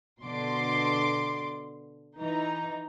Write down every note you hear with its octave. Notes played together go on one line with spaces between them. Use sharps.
B2 D3 C6 D6
E3 D#4 A#5